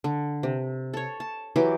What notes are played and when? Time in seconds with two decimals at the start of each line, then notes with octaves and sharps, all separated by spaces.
0.04 D3
0.43 C3
0.94 A4 C#5
1.20 A5
1.56 E3 F#3 G4 D6